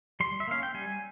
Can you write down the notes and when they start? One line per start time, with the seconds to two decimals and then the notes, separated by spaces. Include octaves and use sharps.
0.20 G3 C6
0.40 E5
0.47 A#3 C#4 F5
0.63 G5
0.74 G3 G#5